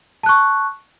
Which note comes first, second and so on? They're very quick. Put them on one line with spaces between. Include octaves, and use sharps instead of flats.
A5 F#6 C#6